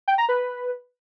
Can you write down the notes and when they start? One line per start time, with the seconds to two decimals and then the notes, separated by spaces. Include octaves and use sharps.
0.08 G5
0.18 A#5
0.29 B4